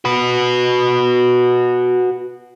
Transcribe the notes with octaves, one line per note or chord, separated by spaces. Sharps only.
F#4 B4